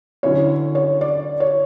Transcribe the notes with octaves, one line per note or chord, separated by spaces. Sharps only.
D3 F#3 C#4 E4 C#5
C#5
D5
C#5